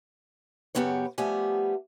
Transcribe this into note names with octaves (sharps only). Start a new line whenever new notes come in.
F#2 C#3 B3 G4 C#5
F3 G3 A3 B3 G4 G#5